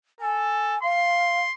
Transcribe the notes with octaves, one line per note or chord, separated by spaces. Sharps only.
A4 G#5
F5 C6